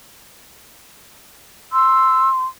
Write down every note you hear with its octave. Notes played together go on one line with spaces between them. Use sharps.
C6 E6